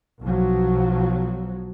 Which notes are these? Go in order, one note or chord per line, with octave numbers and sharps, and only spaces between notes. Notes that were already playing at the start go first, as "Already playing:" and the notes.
B1 F3 F#3